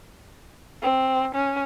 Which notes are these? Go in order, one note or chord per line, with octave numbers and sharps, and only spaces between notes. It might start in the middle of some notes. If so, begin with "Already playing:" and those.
C4
C#4